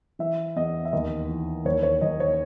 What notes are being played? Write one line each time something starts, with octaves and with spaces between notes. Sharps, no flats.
E3 E5
E2 D#5
E5
D#2 D#5
E3
D#2 C#5
C#5
D#2 D#5
C#5